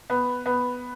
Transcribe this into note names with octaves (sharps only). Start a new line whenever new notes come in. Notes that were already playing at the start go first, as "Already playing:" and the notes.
B3
B3